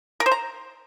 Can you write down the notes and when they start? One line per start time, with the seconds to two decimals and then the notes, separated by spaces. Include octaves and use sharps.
0.20 A#4
0.26 C5
0.32 A#5